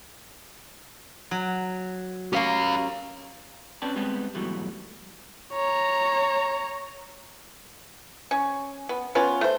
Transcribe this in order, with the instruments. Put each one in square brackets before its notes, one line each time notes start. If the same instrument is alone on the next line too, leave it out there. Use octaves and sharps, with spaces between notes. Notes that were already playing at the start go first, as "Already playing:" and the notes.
[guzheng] F#3
[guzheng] A#3 C#4 [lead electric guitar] G4 F5
[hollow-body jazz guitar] C4 C#4 B4 D5 G5 A5
G3 G#3 B3 C4
G#2 B2 E3 F#3 G3 A3
[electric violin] C#5 A#5
[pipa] C#4
B3
B3 C#4 F4
A3 C5